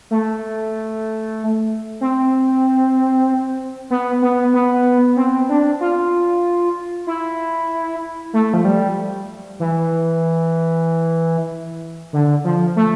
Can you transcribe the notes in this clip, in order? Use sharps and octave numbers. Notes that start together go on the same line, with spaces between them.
A3
C4
B3
B3
B3
C4
D4
F4
E4
A3
F3
G3
E3
D3
F3
A3